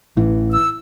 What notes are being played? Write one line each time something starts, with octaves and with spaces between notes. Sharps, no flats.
A1 E3
E6